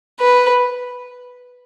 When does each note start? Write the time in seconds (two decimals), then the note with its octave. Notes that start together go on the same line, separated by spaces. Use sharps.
0.20 B4